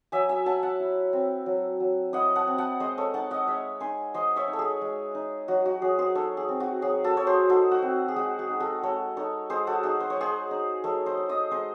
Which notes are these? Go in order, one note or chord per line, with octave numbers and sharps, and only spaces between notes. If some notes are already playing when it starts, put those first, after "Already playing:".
F#3 E5 G#5
E5 G#5
F#3 F#5 A5
F#5 A5
E4
C4
F#3
F#3
E4 D#5 F#5
F#5 A5
C4
F#5 A5
G#3 C5 D#5
A4 C#5
D#4 F#5 A5
D#5 F#5
G#3 C#5 E5
D#4 G#5 C6
G#3 C5 D#5
C#5 E5
D#4
A4
G#4
G#3
D#4
F#3 F#4
F#4
F#3 G#4
G#4 C5
D#4 A4 C#5
G#4
C4
F#4
F#3 G#4
F#4 A4
F#3 C#5
G#4 C5
D#4 F#4 A4
F#4
C4
G#4
G#3 F#4
G#4
D#4
F#4 A4
G#3 A4 C#5
D#4 A4 C#5
G#3 G#4 C5
F#4 A4
D#4 G#4
C5
C#5
G#3 G#4 C5
D#4
G#3 A4 C#5
C5 D#5
D#4
C5 D#5
G#3 C5 D#5